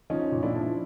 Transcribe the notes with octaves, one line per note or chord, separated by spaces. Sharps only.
F3 C#4 D#4
A#2
D4 E4
F3